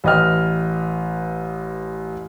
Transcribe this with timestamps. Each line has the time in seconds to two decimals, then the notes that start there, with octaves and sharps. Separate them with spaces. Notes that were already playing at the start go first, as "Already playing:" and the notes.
0.04 A1 B4 D#5 G5 F6